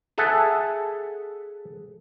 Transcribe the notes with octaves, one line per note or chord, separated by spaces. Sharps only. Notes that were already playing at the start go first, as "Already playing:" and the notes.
G#4 A4 E5 F#5